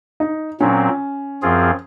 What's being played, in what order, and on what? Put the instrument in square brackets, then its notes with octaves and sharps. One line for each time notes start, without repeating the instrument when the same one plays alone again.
[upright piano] D#4
[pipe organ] A#2 F#3 C4 [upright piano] C#4
[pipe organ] F#2 F3 C4 F4 G#4